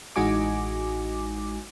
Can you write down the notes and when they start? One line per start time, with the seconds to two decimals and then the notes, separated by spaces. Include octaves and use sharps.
0.16 A1 G#3 D#4 F#4 G#5 D6